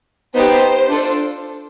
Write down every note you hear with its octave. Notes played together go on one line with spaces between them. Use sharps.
B3 D#4 G4 C5
D4 F4 A4